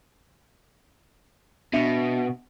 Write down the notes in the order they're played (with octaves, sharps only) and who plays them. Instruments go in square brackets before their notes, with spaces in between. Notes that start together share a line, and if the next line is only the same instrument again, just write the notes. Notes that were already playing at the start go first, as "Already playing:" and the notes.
[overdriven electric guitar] B2 [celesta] D4 E5 C#7